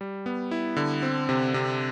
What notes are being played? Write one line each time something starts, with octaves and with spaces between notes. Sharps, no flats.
G3
B3
E4
D3
C4
C3
C3